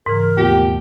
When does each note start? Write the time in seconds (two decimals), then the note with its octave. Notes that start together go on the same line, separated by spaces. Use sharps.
0.06 G#2 C#3 E3 A#4
0.37 D#2 B2 F3 A3 A#3 G4